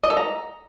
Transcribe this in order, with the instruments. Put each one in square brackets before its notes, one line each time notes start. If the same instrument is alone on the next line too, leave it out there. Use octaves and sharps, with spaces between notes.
[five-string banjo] D#5
A4
A#5